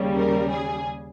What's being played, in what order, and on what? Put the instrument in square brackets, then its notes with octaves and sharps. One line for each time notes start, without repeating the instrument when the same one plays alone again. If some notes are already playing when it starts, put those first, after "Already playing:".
Already playing: [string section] D#2 C#3 G3
A#4
G#4